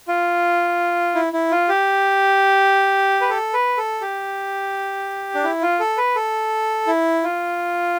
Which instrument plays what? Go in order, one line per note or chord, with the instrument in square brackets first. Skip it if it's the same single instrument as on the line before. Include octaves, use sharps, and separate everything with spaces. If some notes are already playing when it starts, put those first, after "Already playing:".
[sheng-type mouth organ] F4
E4
E4
F4
G4
B4
A4
B4
A4
G4
D4
E4
F4
A4
B4
A4
E4
F4